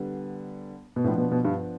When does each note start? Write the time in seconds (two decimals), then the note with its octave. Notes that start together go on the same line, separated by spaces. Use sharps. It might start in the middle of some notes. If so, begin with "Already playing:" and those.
Already playing: D3 G3 B3
0.96 B2
1.04 A2 F3 B3 D4
1.18 B2
1.32 B2
1.45 G2